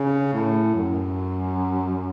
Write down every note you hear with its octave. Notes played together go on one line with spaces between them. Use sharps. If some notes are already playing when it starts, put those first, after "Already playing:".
Already playing: C#3
A2
F#2